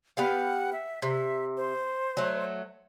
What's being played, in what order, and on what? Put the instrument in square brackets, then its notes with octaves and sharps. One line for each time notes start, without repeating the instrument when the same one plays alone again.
[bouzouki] B3 G4 F5 [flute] F#5
[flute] E5
[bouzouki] C3 [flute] E5
[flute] C5
[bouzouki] F#3 A3